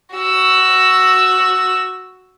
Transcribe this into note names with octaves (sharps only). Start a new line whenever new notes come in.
F#4 E6